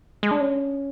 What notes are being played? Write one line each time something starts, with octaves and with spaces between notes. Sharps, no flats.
G#3
D4
C#4